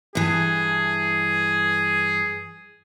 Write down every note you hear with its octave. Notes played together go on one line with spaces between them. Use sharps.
G2 E3 G#4